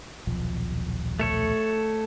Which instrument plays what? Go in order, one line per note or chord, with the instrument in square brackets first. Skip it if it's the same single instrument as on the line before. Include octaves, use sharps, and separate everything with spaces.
[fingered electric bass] D#1 B1 F3
[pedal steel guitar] A3 A4 C#5